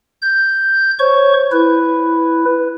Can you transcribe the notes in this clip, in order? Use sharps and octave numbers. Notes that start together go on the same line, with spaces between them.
G6
C5 C#5 C#6
E4 B4